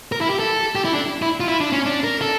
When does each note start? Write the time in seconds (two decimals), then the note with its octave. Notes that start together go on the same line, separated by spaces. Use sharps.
0.12 A#4
0.21 E4
0.30 G4
0.39 A4
0.75 G4
0.85 E4
0.93 D4
1.22 E4
1.40 F4
1.48 E4
1.60 D4
1.72 C#4
1.86 D4
2.04 A#4
2.21 A4